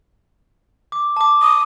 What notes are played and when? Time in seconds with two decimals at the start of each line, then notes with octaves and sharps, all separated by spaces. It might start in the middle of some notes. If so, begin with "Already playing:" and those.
0.92 D6
1.16 A5 D6
1.42 D#6